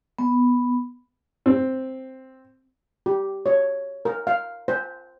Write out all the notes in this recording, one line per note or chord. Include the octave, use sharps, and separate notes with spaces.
B3
C4
G4
C#5
A#4
F5
C5